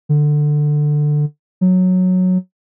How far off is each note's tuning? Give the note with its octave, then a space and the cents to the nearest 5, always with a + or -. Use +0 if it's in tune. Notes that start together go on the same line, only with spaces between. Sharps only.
D3 +15
F#3 -10